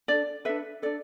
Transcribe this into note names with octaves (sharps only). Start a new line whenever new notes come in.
D4 A4 D5
D4 A4 B4 E5
D4 A4 D5